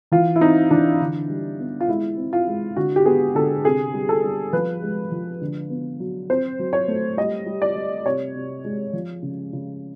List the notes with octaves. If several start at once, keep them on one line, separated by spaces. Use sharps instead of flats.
E3 F4
E4
C4 D#4
E3 D4
D3
G3
B3
F4
G#3 E4
C4
F4
G#3
D3 F#4
G4
B3 G#4
D3 A4
C3 G#4
G3
A4
G3
F3 B4
G#3
F3
D3
B3
F#3
C4 C5
F#3
C#5
A3
G3 D#5
G3
D5
G3
C3 C#5
C3
G#3
F3
C#3
C#3